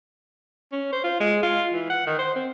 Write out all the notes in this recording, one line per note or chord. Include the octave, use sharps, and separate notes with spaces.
C#4
C5
F4
G#3
F4
E3
F#5
D#3
C5
C4